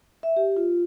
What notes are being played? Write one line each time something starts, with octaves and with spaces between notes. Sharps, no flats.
E5
G4
F4